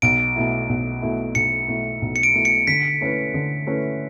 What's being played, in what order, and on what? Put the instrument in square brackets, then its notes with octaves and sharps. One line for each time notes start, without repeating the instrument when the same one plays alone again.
[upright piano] B1 [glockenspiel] D7
[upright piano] B2 A3 E4
B1
B2 A3 E4
[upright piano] B1 [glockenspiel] C#7
[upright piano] B2 A3 E4
B1
[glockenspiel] C#7
D7
[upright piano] B2 A3 E4
[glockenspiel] C#7
[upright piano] D3 [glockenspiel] B6
[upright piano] A3 C#4 E4 B4
D3
A3 C#4 E4 B4